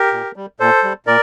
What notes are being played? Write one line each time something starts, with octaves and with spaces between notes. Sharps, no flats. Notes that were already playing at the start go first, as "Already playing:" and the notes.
Already playing: G4 A#4
A#2
G3
A#2 A4 C5
G3
A#2 A#4 D5